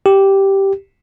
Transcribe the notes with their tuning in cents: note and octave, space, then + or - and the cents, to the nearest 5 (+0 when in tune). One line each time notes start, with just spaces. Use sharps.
G4 -5